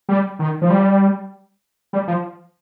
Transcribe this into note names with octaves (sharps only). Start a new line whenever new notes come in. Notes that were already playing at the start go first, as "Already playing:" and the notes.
G3
D#3
F3
G3
G3
F3